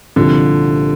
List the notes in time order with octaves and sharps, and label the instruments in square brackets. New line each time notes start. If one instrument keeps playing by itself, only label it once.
[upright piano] C2 A#2 F3 C4 [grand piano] D3